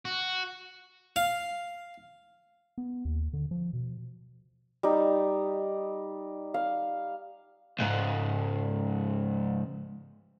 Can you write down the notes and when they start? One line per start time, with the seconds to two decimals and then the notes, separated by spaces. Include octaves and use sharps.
0.05 F#4
1.16 F5
2.78 B3
3.05 D#2
3.33 D3
3.51 F3
3.73 B2
4.83 G3 D#4
6.54 F5
7.79 C#2 G#2